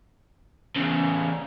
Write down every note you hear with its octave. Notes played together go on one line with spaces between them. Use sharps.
E2 C#3